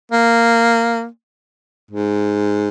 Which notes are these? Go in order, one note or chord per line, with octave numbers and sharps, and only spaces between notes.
A#3
G#2